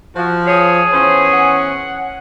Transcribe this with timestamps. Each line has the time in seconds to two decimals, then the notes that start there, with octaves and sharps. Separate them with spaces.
0.16 F3 F#4
0.47 G#4 C#5
0.93 E3 B3 C#4 C5
1.33 F#5